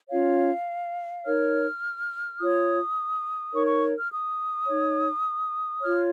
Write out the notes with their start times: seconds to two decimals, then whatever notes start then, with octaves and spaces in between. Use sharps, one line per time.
0.10 C#4 F4 C#5 F5
1.25 D#4 A#4 C#5 F6
2.39 F4 C#5 D#6
3.53 D#4 A#4 C#5 C#6
3.67 C#6
3.97 F6
4.11 D#6
4.67 D#4 C#5
5.82 F4 C#5 F6